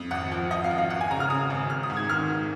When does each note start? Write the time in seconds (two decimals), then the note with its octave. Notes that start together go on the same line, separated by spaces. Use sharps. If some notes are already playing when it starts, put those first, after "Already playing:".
Already playing: F2
0.11 G#1 F#5
0.32 F3
0.51 F3 D#5
0.64 F5
0.71 G#1
0.78 F5
0.90 G#1 F#5
1.01 G#5
1.10 C#3 A#5
1.20 F6
1.30 C#3 D#6
1.50 G#1
1.70 G#1 F6
1.83 D#6
1.90 G#2
1.97 G#6
2.10 D#3 F6
2.30 G#2